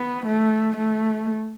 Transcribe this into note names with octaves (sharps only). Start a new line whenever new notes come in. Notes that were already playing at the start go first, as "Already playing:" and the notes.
Already playing: B3
A3
A3